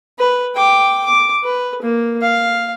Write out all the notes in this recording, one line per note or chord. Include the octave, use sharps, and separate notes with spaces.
B4
G5 D6
D6
B4
A#3
F5